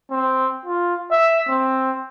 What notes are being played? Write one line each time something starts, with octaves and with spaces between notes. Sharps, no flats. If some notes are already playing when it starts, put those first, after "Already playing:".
C4
F4
E5
C4